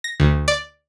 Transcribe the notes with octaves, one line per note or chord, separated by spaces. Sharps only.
A#6
D2
D5